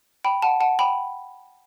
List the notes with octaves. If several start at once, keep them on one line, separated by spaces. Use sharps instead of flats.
G5 B5
F#5 A5
F#5 A5
G5 B5